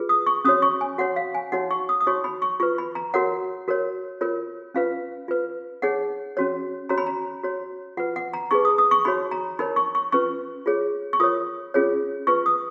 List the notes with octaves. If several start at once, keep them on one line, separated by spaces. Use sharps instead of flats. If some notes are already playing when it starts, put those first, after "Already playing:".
Already playing: F4 G#4 B4
D#6
C#6
C#4 F#4 C#5 D#6
C#6
G#5
F#4 C#5 F#5
F5
G#5
D#4 F#4 C#5 F#5
C#6
D#6
D#6
D#4 F#4 C#5 C#6
B5
C#6
F4 B4 C#6
B5
A#5
F#4 A#4 C#5 F#5
F#4 A#4 C#5
F4 A#4 C#5
C#4 F4 B4 F5
F4 B4
D#4 G#4 C#5 F#5
C#4 F#4 C#5
C#4 F#4 C#5 A#5
B5
A#5
F#4 C#5
F4 B4 F#5
F#5
A#5
D#4 G#4 B4 C#6
D#6
D#6
C#6
D#4 F#4 C#5 B5
A#5
D#4 A#4 C#5 B5
C#6
C#6
C#4 F4 B4 C#6
F4 G#4 C#5
C#6
F4 A#4 C#5 D#6
C#4 F4 G#4 C#5
F4 B4 C#6
D#6